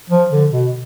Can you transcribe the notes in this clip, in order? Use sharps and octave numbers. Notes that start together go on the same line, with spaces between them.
F3
D3
B2